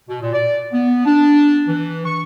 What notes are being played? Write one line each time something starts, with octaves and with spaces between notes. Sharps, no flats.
B2
A#2
D5
B3
D4
E3
C#6